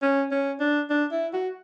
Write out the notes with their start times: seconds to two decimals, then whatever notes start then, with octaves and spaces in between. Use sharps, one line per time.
0.02 C#4
0.31 C#4
0.60 D4
0.90 D4
1.12 E4
1.33 F#4